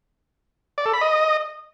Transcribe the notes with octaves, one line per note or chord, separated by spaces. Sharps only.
D5
A4
B5
D#5